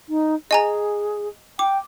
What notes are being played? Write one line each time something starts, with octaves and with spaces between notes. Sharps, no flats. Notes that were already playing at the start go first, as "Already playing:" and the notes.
D#4
G#4 D#5 G#5 A#5
G5 D6